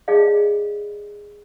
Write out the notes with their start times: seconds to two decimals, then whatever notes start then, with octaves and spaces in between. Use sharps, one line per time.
0.08 D#4 G#4 D5 D#5 F5